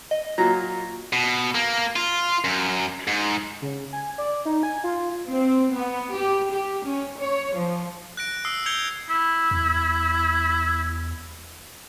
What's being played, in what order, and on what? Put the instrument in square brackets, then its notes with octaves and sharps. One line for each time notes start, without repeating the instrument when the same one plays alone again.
[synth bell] D#5
[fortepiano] A#2 F#3 [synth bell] A#5 A#6
[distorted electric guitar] B2
A#3
F4
F#2
G#2
[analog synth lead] C#3
G#5
D5
D#4
G#5
F4
[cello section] C4
B3
G4
G4
C#4
C#5
F3
[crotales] F#6 A#6 D7
D#6 E6 C7
G6 G#6 C7 C#7 F7 G7
[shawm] E4
[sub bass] E2